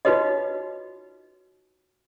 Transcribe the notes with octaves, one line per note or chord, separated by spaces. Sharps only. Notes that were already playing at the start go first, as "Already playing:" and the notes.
D#4 F4 F#4 B4 C#5 D#5